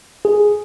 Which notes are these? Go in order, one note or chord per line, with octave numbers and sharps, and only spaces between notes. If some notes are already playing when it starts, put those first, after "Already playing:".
G#4